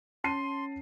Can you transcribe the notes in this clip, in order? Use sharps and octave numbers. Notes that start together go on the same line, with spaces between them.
C#4 A5 C6 C7 D#7